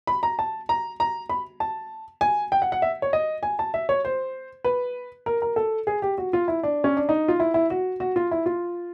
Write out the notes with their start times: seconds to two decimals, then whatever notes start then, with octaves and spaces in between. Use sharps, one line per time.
0.07 B5
0.23 A#5
0.39 A5
0.69 A#5
1.00 A#5
1.29 B5
1.60 A5
2.21 G#5
2.52 G5
2.62 F#5
2.72 F#5
2.82 E5
3.02 C#5
3.13 D#5
3.43 G#5
3.59 A5
3.74 E5
3.89 C#5
4.05 C5
4.64 B4
5.26 A#4
5.42 A#4
5.56 A4
5.87 G#4
6.02 G4
6.18 F#4
6.33 F4
6.48 E4
6.63 D4
6.84 C#4
6.97 D4
7.09 D#4
7.28 F4
7.40 E4
7.54 E4
7.70 F#4
8.00 F#4
8.16 F4
8.31 E4
8.46 F4